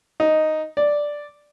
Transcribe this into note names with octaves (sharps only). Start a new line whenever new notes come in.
D#4
D5